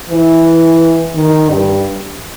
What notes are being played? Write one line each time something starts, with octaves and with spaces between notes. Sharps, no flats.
E3
D#3
G2